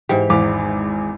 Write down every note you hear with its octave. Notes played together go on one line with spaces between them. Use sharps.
G#2 E3 G4
G#1 E2 B4 F5 D6